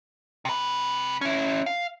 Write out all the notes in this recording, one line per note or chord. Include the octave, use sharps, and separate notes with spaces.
C3 B4
C#4 E4
F5